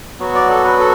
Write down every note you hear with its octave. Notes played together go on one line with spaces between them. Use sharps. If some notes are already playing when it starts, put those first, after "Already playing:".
F#3 B3 F#4
D5
A4
B4
A4